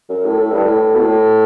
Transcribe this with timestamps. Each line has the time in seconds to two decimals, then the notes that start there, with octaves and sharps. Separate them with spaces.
0.09 F#2
0.25 A2
0.40 A2
0.51 G2
0.65 A2
0.94 B2
1.01 A2